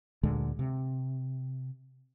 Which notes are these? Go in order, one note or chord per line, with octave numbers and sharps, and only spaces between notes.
D2 A#2 D3 G#3
C3